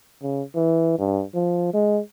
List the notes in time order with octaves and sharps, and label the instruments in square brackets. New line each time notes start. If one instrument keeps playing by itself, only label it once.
[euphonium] C#3
E3
G2
F3
G#3